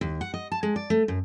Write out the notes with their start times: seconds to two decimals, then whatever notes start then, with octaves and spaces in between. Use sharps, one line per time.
0.01 D#2
0.21 F#5
0.34 D#5
0.52 A5
0.63 G#3
0.76 D5
0.90 A3
1.08 F#2